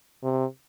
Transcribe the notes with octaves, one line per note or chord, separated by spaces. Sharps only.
C3